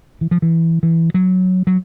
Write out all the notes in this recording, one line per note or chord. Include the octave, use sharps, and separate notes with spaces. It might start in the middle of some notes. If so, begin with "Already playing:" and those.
E3
F3
E3
E3
F#3
F#3